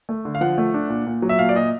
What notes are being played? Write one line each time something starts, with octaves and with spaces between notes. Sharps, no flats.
A3
D3
F5
F3 F#5
A3
D4
A#2
A#2
F#3
E5
A#2 F5
D5
A#2 D#5